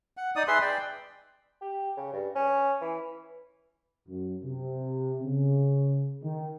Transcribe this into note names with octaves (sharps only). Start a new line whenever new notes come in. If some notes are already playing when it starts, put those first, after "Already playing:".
F#5
D#4 D5 D#6
G#4 B4 E5 C6
D5 G5
G4
C#3
G2
C#4
E3
F#2
C3
C#3
D#3